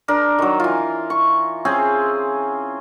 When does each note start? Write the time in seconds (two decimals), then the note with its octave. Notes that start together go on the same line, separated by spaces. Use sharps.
0.08 D4 A#4
0.39 D#3 F#3
0.60 E3 F4
1.10 C#6
1.65 C4 C#4 G#4 C6